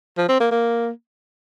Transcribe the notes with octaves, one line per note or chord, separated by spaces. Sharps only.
F3
C4
A#3
A#3